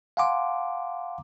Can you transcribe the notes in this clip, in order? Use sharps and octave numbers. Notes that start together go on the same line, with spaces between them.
F5 F#5 G#5 A#5 C6 D6